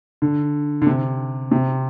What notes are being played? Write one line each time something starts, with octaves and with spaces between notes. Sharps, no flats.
D3
D3
C3
C3